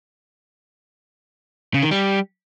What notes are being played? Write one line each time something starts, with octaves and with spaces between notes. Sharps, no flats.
C#3
D#3
G3